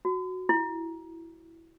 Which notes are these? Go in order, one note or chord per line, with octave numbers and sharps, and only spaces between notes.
F#4
E4